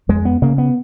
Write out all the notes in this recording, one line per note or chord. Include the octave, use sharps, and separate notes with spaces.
F2 G#3
B3
C#3 A#3
B3